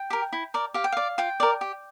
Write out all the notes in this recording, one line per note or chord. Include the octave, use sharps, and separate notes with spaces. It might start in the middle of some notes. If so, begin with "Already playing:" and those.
Already playing: G5
G4 A#4
E4
A#4 D5
G4 F5
G5
D5 F5
F4 G5
A#4 D5
G4